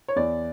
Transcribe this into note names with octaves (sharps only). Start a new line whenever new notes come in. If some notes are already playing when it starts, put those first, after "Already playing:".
C#5
E2 D5